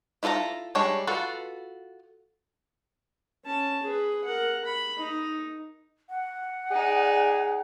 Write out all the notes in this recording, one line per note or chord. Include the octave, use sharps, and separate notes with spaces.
E4 F4 A4 C5 A#5
G3 G#3 D4 A4 C#5
F4 F#4 A4 B4
C#4 A5
G#4 B4
A#4 F#5
B5
D#4
F#5
D#4 G#4 D5